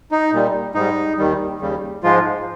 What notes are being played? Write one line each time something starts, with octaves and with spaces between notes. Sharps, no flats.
D#4
A#2 G3
G#2 G3 D#4
D#2 D#3 G3
D#2 C#3 G3
G#2 F3 G#3 F4